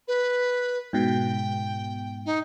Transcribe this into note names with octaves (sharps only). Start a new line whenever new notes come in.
B4
G#2 B2 G5
D#4